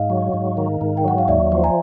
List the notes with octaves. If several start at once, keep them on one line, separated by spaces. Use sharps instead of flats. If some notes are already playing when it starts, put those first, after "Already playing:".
Already playing: G#2 D#5 F5
F#3
G#2
D#3
G#2
G5
F#3 F#5
F5
D#2 D5 E5
F3
G#5 A#5